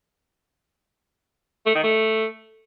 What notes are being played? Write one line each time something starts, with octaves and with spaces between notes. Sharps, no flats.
A3
D#3
A3